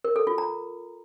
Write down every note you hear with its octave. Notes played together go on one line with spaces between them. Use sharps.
A#4
A4
F4
A#5